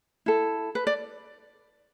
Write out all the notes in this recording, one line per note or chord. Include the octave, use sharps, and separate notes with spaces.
E4 A4
B4
D5